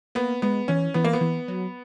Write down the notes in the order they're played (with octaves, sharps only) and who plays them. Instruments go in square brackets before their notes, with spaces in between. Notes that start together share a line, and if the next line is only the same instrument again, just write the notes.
[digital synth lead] A#3 [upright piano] B3
[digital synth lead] G#3 [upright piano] B3
[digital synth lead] E3 [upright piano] C#4
[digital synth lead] E3 [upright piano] B3
[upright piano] A#3
B3
[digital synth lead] E3
F#3